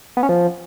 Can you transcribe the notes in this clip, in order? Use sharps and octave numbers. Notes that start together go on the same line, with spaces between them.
B3
C#4
F3